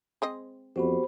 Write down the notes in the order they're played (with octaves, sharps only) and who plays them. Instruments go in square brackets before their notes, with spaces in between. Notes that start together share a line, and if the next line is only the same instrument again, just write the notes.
[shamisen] G#3 C4 D#5
[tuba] F2 [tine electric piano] B3 F#4 G4 [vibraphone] C5 B5